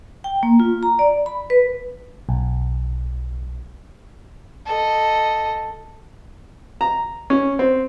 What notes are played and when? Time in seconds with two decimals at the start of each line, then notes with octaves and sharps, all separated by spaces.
0.24 G5
0.43 A#3
0.60 F4
0.83 A#5
0.99 D5
1.26 B5
1.50 B4
2.29 B1
4.66 A4 D#5
6.81 A#5
7.30 C#4
7.59 C4